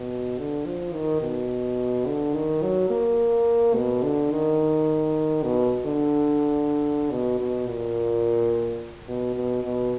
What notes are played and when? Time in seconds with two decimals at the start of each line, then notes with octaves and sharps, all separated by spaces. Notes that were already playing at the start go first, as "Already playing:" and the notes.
Already playing: B2
0.39 D3
0.66 F3
0.94 D#3
1.22 B2
2.07 D3
2.34 D#3
2.63 F#3
2.90 A#3
3.75 B2
4.03 D3
4.32 D#3
5.44 B2
5.86 D3
7.11 B2
7.40 B2
7.68 A#2
9.08 B2
9.36 B2
9.64 B2